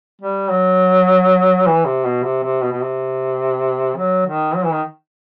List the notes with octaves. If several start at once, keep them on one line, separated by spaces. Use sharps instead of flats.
G3
F#3
E3
C3
B2
C3
C3
B2
B2
C3
F#3
D#3
F#3
E3
D#3